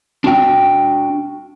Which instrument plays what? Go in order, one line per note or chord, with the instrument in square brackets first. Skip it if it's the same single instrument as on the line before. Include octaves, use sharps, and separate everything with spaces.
[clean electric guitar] D4 F#4 G5